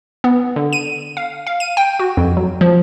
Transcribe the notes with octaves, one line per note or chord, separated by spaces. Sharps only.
B3
D3
D#7
F5
F5
D#7
G5
F#4
F2
F#3
F3